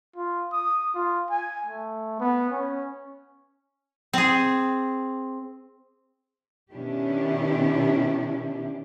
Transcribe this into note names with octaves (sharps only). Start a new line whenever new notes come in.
F4
D#6
F4
G#5
A3
B3
C#4
C4 G#4
B2 D#3 C#4 D4 E4 G4